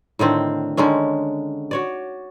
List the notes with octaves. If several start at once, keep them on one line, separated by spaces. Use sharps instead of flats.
A2 D3 D#3 C4
D3 D#3 G#3 C#4
F#4 C#5 D5